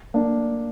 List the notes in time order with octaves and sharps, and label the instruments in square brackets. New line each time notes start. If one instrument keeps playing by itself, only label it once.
[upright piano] A#3 D4